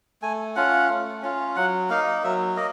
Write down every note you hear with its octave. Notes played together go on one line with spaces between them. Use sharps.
A3 G#5
C#4 F4 F#5
A3
C#4 F4
F#3 F#5
A#3 D#4 F5
F#3 E5
A#3 D#5